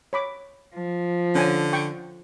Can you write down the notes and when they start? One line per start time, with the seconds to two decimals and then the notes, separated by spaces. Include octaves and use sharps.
0.13 C#5 B5 D6
0.73 F3
1.35 D3 C#4 G#5
1.73 G5 C#6